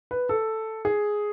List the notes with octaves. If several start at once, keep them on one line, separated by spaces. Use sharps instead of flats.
B4
A4
G#4